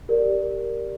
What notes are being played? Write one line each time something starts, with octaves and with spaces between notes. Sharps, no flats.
G4 A#4 D5